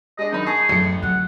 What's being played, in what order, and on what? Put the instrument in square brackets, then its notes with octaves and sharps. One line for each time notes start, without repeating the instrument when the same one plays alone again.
[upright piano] G#3 D4 [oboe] D#5
[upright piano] F#2 D#3 B5 [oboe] D#4
[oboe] G#4 [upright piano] G#5 A5 C#6
[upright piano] A1 A3 C#7 [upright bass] F#2
[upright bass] D3 F#3 [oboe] F#5